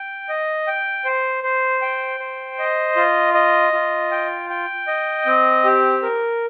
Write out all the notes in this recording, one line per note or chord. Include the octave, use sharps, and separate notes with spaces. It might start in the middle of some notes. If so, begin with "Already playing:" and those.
Already playing: G5
D#5
G5
C5
C5
G5
C5
D#5
F4
D#5
F4
G5
G5
D#5
C4
G4
A#4